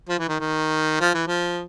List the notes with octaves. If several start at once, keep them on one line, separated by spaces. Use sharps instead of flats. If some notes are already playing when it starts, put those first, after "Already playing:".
F3
E3
D#3
D#3
F3
E3
F3